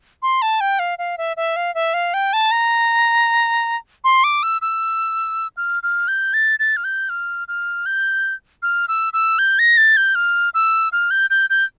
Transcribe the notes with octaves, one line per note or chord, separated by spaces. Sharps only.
C6
A5
G5
F5
F5
E5
E5
F5
E5
F5
G5
A5
A#5
C6
D6
E6
E6
F6
F6
G6
A6
A6
F6
G6
F6
F6
G6
F6
E6
E6
G6
A#6
A6
G6
F6
E6
F6
G6
G6
G6